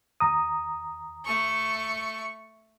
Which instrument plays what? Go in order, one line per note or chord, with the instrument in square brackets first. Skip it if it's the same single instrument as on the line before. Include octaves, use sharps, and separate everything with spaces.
[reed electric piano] D#2 A#5 D#6
[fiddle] A3 C#6